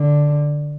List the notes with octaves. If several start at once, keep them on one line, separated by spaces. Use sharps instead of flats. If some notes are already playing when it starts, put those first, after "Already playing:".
Already playing: D3